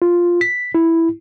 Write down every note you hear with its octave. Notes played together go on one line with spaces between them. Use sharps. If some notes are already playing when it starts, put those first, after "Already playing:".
F4
B6
E4